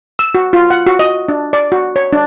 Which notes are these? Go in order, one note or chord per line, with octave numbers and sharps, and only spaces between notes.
E6
F#4
F4
F#5
F#4
D#5
D4
D5
F#4
C#5
D4